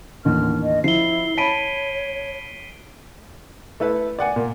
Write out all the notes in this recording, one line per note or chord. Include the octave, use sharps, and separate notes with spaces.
A1 D#2 D3 F6
D#5
F3 E4 C7 G7
C#5 A5 B5 B6 D7 D#7
A3 E4 A4 B4
D5 F#5 G#5
A#2